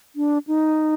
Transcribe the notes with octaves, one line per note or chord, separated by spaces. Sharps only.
D4
D#4